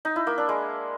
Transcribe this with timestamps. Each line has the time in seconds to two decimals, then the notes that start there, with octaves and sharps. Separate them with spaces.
0.05 D#4
0.16 E4
0.27 A#3
0.38 D4
0.49 G#3